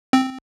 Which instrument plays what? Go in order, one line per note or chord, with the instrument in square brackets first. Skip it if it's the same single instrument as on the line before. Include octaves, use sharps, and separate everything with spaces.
[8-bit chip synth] C4